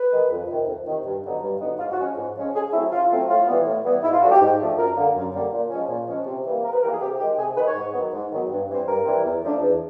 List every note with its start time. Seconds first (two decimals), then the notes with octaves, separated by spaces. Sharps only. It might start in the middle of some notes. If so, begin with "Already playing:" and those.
Already playing: B4
0.13 D#3 G#3
0.31 F2
0.49 C3 D#3
0.68 F2
0.86 C3 D#3
1.05 G2
1.24 D3 F#3 B3 D#4
1.42 G2
1.61 D3 F#3 B3 D#4
1.79 G#2 F4
1.92 F#4
1.99 F3 G#3 C#4
2.18 G#2
2.35 F3 G#3 C#4
2.54 C#3 G#4
2.72 F#3 A3 C4 E4
2.92 C#3 F4
3.10 F#3 A3 C4
3.28 A2 F4
3.47 E3 G3 B3
3.66 A2
3.85 E3 G3 B3
4.03 G#2 E4
4.13 F4
4.22 F3 A3 D4 F#4
4.31 G4
4.41 G#2
4.60 F3 A3 D4
4.78 F#2 A#4
4.97 D3 G3 A#3
5.15 F#2
5.34 D3 G3 A#3
5.53 A#2
5.70 F3 G#3 C#4
5.89 A#2
6.08 F3 G#3 C#4
6.26 C3
6.45 E3 G3 A#3
6.64 C3 A#4
6.73 B4
6.83 E3 G3 A#3 A#4
6.92 G#4
7.01 C3 G4
7.19 D#3 G4
7.23 G#3
7.38 C3 G#4
7.56 D#3 B4
7.61 G#3
7.67 C#5
7.75 G#2
7.94 D#3 F#3 B3
8.13 G#2
8.31 D#3 F#3 B3
8.50 G2
8.69 E3 G3 C4
8.87 G2 A#4
9.06 E3 G3 C4
9.24 E2
9.43 C#3 F3 A3 D4
9.61 E2